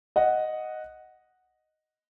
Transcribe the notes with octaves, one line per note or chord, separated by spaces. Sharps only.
D#5 F#5